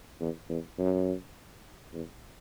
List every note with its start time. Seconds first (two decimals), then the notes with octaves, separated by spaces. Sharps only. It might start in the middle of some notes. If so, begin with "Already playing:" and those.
0.20 E2
0.49 E2
0.78 F#2
1.93 E2